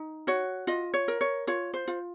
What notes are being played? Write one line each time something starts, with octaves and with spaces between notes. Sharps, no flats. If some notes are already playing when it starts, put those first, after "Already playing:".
Already playing: D#4
F#4 C#5
F4 D#5
C#5
A#4
C#5
F4 C#5
C5
F4